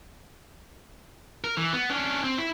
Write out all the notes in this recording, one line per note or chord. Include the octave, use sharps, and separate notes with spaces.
A#4
E3
B3
C#4 D4
C4
E4